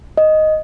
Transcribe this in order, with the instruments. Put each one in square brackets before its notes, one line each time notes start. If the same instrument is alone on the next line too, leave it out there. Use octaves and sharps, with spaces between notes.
[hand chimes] D#5